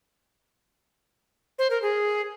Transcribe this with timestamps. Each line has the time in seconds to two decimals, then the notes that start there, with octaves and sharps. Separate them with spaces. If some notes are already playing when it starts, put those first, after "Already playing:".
1.59 C5
1.70 A#4
1.82 G#4